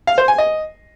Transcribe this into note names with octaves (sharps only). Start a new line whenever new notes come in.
F5
C5
G#5
D#5